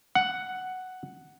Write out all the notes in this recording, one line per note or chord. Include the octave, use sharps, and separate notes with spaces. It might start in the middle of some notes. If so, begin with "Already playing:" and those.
F#5